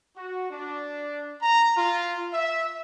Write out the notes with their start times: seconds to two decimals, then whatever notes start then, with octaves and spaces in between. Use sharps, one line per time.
0.16 F#4
0.51 D4
1.42 A#5
1.77 F4
2.33 E5